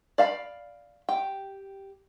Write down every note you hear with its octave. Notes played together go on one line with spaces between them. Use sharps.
D5 F5 A5 B5
G4 G5